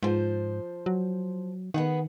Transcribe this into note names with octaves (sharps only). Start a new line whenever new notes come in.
G#2 F3 C5
F#3
D#3 B3 G#4 F#5